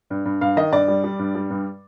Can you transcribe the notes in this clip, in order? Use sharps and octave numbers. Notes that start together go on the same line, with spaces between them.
G2
G2
G2 F5
D#3 D#5
G2 D5
G3
G3
G2
G3
G2